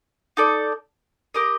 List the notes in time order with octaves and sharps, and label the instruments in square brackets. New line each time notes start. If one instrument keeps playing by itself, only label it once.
[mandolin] D#4 A4 D5
G4 A#4 D#5